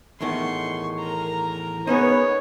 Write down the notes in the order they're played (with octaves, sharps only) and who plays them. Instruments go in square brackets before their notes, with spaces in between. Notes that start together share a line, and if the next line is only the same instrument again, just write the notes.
[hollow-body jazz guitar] E2 A2 D#3 [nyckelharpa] C6 C#6
[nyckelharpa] A#4 A#5
[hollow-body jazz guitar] G#3 C#4 D#4 [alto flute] B3 [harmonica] C#5